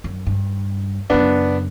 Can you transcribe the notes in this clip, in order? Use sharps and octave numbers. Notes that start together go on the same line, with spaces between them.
F#2
G2
F#2 C#3 B3 D4